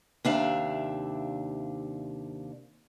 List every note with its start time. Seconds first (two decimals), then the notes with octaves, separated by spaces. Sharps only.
0.25 D#2 C3 D4 E5 F5